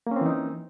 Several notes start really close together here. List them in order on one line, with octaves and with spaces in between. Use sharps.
A#3 C#4 C4 E3 D#4